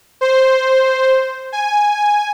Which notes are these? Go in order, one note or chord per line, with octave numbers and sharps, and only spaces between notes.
C5
G#5